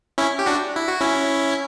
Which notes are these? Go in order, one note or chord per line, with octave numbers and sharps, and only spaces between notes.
C#4 E4
G4
D4 F#4
E4
F#4
C#4 E4